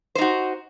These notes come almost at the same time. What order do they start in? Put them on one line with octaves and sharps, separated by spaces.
C5 D#4 F#4